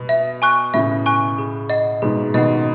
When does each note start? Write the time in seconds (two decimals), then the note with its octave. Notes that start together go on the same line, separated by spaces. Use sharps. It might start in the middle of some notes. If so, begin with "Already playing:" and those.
Already playing: B2
0.09 E5
0.42 G#5 C#6 F#6
0.74 A2 C#3 E5
1.06 G#5 C#6 F#6
1.38 G#4
1.70 D#5 F#5
2.02 G#2 B2 G#4
2.34 B2 D#3 D#5 F#5